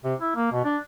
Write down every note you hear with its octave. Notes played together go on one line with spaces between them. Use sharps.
C3
E4
A#3
B2
D4